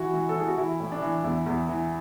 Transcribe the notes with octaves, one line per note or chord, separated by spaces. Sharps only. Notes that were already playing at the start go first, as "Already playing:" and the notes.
Already playing: E3 F#4
E3
A4
E3 G#4
F#4
E3 E4
A2
D4
E3
E2 E4
E2
E3